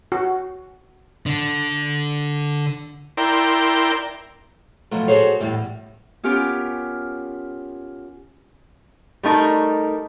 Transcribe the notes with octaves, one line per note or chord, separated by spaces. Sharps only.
F#4
D3 D4
E4 A#4 D5 G5 C6
B2 F3 F#3 A3
F#4 G#4 A4 C5 C#5
E2 A2 G3
B3 C#4 F4 G4 A#4
G3 A3 D#4 A#4